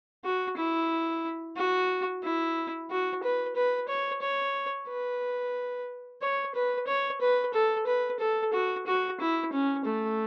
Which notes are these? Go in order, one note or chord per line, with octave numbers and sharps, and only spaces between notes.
F#4
E4
F#4
E4
F#4
B4
B4
C#5
C#5
B4
C#5
B4
C#5
B4
A4
B4
A4
F#4
F#4
E4
C#4
A3